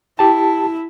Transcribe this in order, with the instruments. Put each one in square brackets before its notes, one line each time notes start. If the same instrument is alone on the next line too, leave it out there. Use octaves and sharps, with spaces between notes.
[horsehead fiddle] E4 [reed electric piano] G4 A5